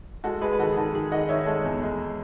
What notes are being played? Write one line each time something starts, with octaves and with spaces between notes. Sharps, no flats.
G#3 F#4 A4
G#3 G#4 B4
B4
D#3 F#4 A4
G#4
D#3 F#4 A4
D#3 G#4
D#3 D#5 F#5
D#3 C#5 E5
G#3 A4 C#5
E2
G#3